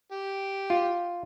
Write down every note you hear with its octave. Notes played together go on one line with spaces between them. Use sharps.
G4
F4